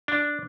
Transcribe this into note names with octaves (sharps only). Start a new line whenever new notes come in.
D4